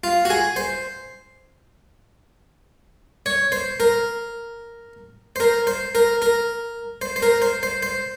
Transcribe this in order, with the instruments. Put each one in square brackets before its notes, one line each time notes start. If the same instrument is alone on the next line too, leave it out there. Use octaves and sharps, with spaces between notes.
[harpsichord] F4
F#4
G#4
C5
C#5
C5
A#4
C5
A#4
C5
A#4
A#4
C5
C5
A#4
C5
C5
C5